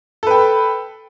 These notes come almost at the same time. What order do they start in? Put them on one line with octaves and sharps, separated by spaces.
A4 B4 G5